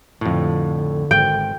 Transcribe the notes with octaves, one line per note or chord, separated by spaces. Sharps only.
F2 A2 D3
G#1 G5